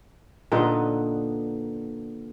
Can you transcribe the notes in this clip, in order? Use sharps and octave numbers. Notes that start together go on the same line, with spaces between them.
A#2 D3 B3 D#4